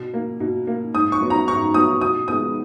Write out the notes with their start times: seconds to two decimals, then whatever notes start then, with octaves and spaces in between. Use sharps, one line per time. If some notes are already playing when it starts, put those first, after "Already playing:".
Already playing: B2
0.14 A#3
0.40 B2
0.67 A#3
0.94 G#2 D#6
1.12 C#6
1.21 F#3 B3
1.30 A#5
1.48 G#2 C#6
1.74 F#3 B3 D#6
2.01 B2 D#6
2.28 G#3 B3 D#6